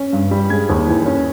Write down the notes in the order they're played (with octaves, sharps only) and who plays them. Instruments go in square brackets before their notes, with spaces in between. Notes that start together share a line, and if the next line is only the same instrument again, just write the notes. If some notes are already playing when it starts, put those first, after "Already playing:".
Already playing: [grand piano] C#4
G2
G3
G#3 G#6
D#2
E3
C#4